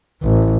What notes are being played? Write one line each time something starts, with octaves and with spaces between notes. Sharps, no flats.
A1